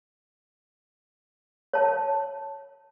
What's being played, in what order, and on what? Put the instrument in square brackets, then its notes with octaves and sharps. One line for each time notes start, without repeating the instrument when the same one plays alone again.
[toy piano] C#5 A5